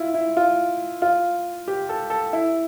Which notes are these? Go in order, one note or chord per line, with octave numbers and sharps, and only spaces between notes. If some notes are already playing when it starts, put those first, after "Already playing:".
Already playing: E4 F4
E4
F4
F4
G4
A4
A4
E4